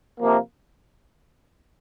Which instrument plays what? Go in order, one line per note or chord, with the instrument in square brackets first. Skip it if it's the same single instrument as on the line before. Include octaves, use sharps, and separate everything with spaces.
[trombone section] C3 F3 A#3